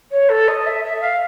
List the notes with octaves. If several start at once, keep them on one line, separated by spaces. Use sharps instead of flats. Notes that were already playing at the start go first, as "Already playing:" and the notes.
C#5
A4
D#5
E5
E5
F5